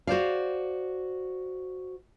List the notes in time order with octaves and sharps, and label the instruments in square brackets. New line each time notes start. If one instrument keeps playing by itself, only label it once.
[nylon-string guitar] F#4 C5 D5 F5